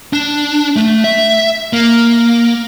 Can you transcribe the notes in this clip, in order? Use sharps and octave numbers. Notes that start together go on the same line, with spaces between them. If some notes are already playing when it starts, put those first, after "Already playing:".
D4
A3
E5
A#3